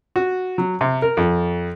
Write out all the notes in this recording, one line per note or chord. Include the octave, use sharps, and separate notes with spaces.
F#4
F#3
C3
A#4
F2